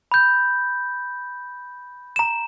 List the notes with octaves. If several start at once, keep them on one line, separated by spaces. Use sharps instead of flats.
B5 G6
A#5 E7